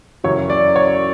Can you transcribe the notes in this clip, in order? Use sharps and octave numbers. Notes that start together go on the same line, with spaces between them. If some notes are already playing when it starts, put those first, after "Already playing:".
F#2 C#3 E3 C#5
D5
C#5